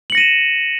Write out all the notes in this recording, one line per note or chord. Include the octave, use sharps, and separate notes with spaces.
A#6 C#7 D#7 E7 F#7